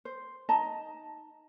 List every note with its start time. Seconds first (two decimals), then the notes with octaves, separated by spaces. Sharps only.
0.05 C5
0.49 D#4 D#5 A5 A#5